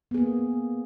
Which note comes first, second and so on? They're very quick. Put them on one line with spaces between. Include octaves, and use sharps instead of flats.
B3 G#4 A#3